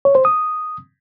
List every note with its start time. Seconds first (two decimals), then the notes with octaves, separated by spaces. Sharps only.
0.05 C#5
0.15 C5
0.25 D#6